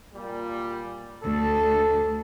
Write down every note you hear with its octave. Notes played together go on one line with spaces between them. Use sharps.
A#2 G3
D2 A4